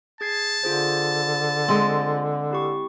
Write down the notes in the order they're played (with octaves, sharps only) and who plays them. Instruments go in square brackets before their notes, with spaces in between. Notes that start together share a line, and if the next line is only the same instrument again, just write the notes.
[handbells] G#4 G#6 C7 [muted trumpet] A5
[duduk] D3 [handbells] F4 G#4 C5
[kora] G#3 C4
[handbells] E4 G4 C#6